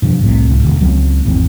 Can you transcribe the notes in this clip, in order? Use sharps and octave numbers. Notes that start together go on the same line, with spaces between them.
G2 C3 F3
G1 C2 A2 C3
C2 G#2
E1 D3
C#2 F#3 B3 C4
G#1 E2 C4